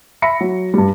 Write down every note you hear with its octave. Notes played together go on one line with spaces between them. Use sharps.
E5 B5 A#6 C#7
F#3
G2 G3